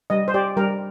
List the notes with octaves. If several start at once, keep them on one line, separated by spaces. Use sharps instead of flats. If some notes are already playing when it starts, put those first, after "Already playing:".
G3 D#5
C5
G4 D5
G3 A#4